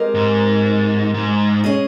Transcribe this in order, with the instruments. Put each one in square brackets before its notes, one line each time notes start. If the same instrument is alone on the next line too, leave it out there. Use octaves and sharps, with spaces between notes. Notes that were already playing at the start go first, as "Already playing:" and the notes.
Already playing: [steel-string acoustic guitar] G#3 C4 G4 A#4 D#5
[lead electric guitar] G#2
G#2
[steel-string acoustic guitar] G#3 C#4 G#4 D#5